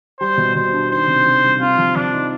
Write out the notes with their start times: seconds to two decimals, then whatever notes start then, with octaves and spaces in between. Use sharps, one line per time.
0.20 G3 C5
0.37 B2
0.55 B2 C5
0.73 D4
0.90 D#3 C5
1.08 C3
1.26 C3
1.43 G3
1.61 C4 F4
1.78 F3
1.95 F3 D4
2.13 D#4